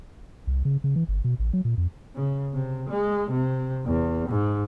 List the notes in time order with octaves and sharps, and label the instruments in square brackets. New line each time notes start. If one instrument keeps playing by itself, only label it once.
[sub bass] C2
C#3
C#3
E3
G1
B2
A1
F#3
A#2
F2
[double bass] C#3
C3
G#3
C3
E2
G#2